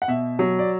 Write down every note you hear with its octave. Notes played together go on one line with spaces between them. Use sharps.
F#5
B2 E5
F#3
D5